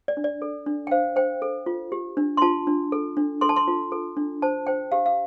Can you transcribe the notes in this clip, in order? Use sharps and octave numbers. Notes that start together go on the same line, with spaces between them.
D5
D4
D5
A4
D4
G5
C5 F5
C5 G5
A4
F4
G4
D4
C6
F4 A5
D4
A4
D4
A4 C6
A5
C6
F4
A4
D4
C5 A5
C5 G5
G4 F5
F5